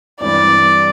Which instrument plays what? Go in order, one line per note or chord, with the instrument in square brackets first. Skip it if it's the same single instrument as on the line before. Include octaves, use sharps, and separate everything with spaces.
[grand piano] G2 E3 G3 C4 [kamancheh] D5